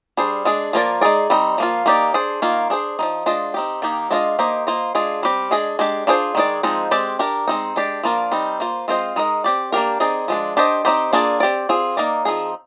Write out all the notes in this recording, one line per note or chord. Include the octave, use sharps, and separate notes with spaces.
G3 D4 G#4 C5
G#3 D4 G#4
F3 A#3 F4 A#4 D5
G#3 D#4 G#4 D5
G3 C4 D#4
F3 A#3 F4
A#3 D#4 G4 D5
D4 G#4 C5
D#3 A#3 F4
D4 G#4 C5
F3 G#3 D#4
G#3 D4 F4 C5 D#5
C4 D#4 G4
D#3 A#3 D#4 G4
G#3 D4 F4 C5 D#5
A#3 D#4 G4 C5 D#5
A#3 F4 C5 D#5
G#3 D4 F4 G#4
G3 C4 G4
G#3 D4 G#4 D#5
G#3 D4 G4
D4 F4 G#4 C5
D#3 G#3 D#4 G#4 D5
F3 G#3 C4 D#4
G#3 C4 G4 D5
D4 G4 A#4
G#3 C4 D#4
G#3 D4 G4 D5
F3 A#3 D4 F4 A#4
G3 C4 D#4
A#3 F4 C5
G#3 C4 F4 C5 D#5
G#3 D#4 A#4 D#5
C4 G4 D5
A#3 D4 G4 A#4
C4 D#4 G#4 D5
F3 G#3 D4
D4 G4 C5 D#5
C4 D#4 G4 C5
A#3 D4 F4 G#4 D5
C4 G4 D5
C4 F4 G#4
A#3 D#4 A#4 D5
F3 C4 D#4 G#4